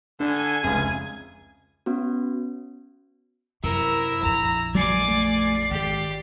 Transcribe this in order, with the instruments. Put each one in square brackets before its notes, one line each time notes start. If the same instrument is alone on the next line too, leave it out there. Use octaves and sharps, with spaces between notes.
[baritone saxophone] D3 [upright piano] D4 [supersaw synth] G#5 G#6
[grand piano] F1 C#2 [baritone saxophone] G#4
[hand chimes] B3 C#4 F#4
[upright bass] F#2 [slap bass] C3 [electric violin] E4 E6 [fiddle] A#4
[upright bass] A#1 F2 [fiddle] A#5
[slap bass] F#3 G#3 A#3 [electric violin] D5 C7 [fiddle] G#5 D6
[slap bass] A3
[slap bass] G#1 [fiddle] G4